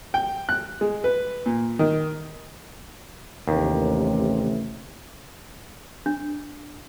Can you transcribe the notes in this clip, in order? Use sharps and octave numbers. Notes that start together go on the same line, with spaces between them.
G5
F#6
G#3
B4
A#2
D#3
A1 D#2 C3
D4